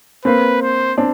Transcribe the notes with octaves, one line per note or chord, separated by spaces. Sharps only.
A#3 C4 B4
C5
C4 D4